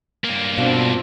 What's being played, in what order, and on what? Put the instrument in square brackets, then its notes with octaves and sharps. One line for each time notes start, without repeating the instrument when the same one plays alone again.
[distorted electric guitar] G2 A#3
[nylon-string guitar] B2 F5 [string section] C4 D4 F4